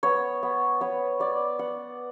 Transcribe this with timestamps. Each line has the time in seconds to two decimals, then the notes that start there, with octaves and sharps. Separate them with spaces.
0.03 B3 C#5
0.43 B3
0.81 B3 C#5
1.20 B3 D5
1.59 B3 F#5